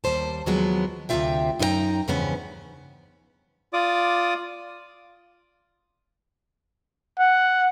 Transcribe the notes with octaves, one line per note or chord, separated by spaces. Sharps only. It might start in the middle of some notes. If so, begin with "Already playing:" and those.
D#2 G3 C5 A5
D#2 F3 F#3 G#3 B3
D2 C3 C4 F4 E5 G5
F#2 D#4 G4 A#4 G5 A#5
E2 G2 C#3 F3 B3 C#4
F4 D5 D6 D#6
F#5